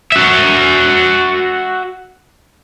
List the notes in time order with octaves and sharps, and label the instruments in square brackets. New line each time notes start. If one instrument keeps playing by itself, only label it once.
[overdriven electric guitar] F#4 E5